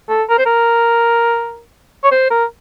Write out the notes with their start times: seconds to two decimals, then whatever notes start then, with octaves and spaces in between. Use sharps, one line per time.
0.09 A4
0.29 A#4
0.38 C5
0.46 A#4
2.04 C#5
2.11 C5
2.31 A#4